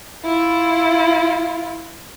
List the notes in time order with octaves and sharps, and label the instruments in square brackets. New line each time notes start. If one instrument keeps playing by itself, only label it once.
[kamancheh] E4 F4